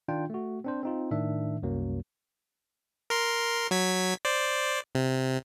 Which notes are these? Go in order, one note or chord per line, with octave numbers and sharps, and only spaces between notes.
D#3 D4 F4 G5
A3 F#4
C4 D4 C5
C4 D#4 F4
A2 D#3 D4 E5
C2 F#2 F#3 A#3
A#4 C6
F#3 G#6 B6
C5 D5
C3